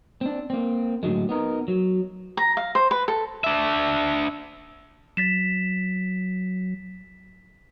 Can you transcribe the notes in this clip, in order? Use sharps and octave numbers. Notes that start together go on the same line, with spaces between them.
C4 D4
A#3 C4
A2 D3 F#3 G#3
B3 D#4 A#4
F#3
A#5
F5
C5
B4
A4
D4 E5
F#3 A6 B6 E7